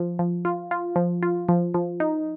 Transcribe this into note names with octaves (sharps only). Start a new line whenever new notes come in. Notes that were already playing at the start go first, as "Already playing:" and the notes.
Already playing: F3
F3
F4
F4
F3
F4
F3
F3
D#4